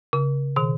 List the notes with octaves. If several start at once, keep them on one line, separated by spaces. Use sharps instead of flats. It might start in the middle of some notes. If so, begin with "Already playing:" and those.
C#3
B2 D#3